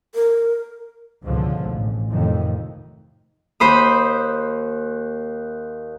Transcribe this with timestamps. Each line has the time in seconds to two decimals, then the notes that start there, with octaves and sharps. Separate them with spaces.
0.15 A#4
1.24 C#2 G#2 B2 D3 F3
1.65 A1
2.10 F2 A2 C3 D#3
3.60 D#2 C5 B5 D#6